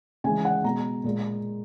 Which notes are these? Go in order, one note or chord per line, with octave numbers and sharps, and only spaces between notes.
C#3 E3 G#3 G#5
F#5
B2 G#3 A#5
A#2 G#3